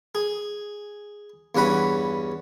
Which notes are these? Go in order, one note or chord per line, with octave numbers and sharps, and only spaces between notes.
G#4
E2 G2 C#4 F#5 B5